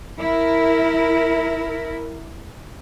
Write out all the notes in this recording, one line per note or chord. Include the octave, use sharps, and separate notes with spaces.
E4 A#4